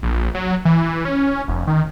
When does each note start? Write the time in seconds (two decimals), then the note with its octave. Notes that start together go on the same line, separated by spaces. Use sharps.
0.03 A#1
0.35 F#3
0.65 E3
1.05 C#4
1.48 F1
1.67 D#3